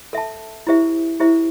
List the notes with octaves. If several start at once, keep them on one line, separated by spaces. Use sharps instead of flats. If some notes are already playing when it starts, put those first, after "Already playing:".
A4 E5 A5
E4 G4 C5 E5
E4 G4 C5 E5